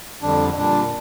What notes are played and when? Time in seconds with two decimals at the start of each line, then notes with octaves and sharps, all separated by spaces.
0.22 F2 D3 G3 D4
0.56 A#2 G3 D4